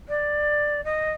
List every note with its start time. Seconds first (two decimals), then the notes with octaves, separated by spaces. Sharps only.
0.08 D5
0.84 D#5